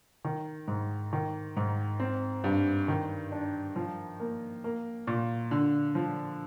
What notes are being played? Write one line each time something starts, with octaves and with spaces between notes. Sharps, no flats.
D#3
G#2
D#3
G#2
C4
G2
D#3
D4
F3
A#3
A#3
A#2
D3
F3